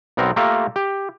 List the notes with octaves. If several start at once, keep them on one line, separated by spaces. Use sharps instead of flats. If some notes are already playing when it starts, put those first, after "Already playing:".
B1 B3 C4 A#4
A3 A#3 F4 G4 A4 A#4
G4